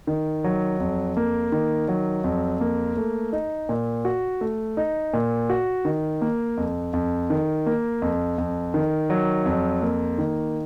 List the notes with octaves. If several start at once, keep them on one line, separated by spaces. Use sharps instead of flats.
D#3
F#3
F2
A#3
D#3
F#3
F2
A#3
A3
D#4
A#2
F#4
A3
D#4
A#2
F#4
D#3
A#3
F2
F2
D#3
A#3
F2
F2
D#3
F#3
F2
A#3
D#3